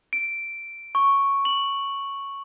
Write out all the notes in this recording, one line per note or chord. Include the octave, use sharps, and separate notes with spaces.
D7
C#6
F#7